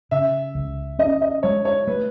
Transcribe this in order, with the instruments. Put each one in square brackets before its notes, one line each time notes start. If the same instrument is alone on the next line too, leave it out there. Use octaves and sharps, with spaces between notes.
[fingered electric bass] C#3 [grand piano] E5
[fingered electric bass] C#2
[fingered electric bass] C#4 [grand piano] D#5
[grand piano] D#5
[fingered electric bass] G#3 [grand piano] C#5
[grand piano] C#5
[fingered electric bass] A3 [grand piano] B4